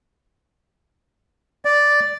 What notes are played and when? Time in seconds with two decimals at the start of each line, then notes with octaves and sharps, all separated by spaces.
1.65 D5